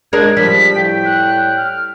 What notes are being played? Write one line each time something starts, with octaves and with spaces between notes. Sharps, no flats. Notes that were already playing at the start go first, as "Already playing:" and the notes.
G#3 D4 A#4 G#6
F3 G3 B6
A2 G5
F#6
F6